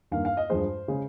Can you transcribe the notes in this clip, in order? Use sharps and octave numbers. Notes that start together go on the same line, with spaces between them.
G2 D#3 A#3 F5
F5
D#5
G2 F3 G#3 C5
C#3 G#3